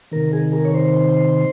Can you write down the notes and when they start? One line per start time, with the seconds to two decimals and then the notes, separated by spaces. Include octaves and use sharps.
0.12 C3 D#3 A#4
0.33 G#4
0.53 A#4
0.65 C#5
0.74 C5